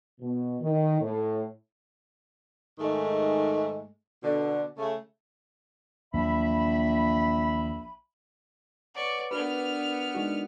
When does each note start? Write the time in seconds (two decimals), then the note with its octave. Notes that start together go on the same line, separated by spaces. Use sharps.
0.20 B2
0.60 D#3
1.00 A2
2.79 G#2 D#3 G#3 A3
4.23 B2 D3
4.77 C#3 A3
6.14 A#1 D#2 F#3 E5 B5
8.95 B4 C#5 D5 F#5 C#6
9.31 B3 D4 F#4 A#4 B4 D5 F6
10.15 G#3 D#4 F#4